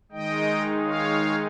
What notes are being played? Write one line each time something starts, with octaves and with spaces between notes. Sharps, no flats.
D#3 G#3 D#4 D#5 G5
C#5 F5